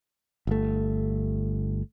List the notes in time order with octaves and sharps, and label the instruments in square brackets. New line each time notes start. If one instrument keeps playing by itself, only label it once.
[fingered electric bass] G1 A3